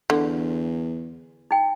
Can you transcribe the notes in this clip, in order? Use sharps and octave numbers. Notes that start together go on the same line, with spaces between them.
E2 D3
D#4 G5